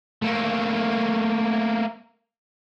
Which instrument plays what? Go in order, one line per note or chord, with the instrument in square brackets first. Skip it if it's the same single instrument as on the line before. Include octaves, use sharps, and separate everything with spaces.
[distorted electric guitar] A3 A#3